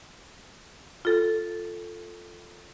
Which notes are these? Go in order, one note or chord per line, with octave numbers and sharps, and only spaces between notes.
F4 A4